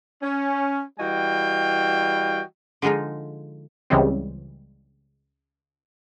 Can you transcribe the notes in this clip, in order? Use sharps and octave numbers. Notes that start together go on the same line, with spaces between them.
C#4
E3 G3 F#4 D#5 F5 G5
D3 F3 G#3 D#4 F4
C#2 C#3 E3 G3 C4